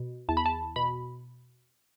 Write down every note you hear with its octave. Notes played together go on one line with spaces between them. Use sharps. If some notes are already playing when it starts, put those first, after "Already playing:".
Already playing: B2
E2 A5
B5
A5
B2 B5